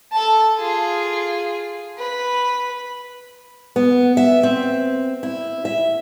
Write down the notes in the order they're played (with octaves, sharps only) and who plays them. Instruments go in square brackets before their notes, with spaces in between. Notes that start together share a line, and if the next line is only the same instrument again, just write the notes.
[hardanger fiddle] A4 A5
F4 G#4
B4 B5
[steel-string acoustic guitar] B3
E5
C4
E4
E5